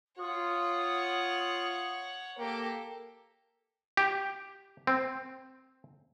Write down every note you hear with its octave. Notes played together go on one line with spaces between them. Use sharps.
F4 C#5 F#5 D#6
A#3 G4 A4
G4
C4